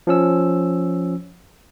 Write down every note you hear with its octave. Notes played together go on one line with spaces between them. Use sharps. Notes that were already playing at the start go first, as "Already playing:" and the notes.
F3 C#4 E6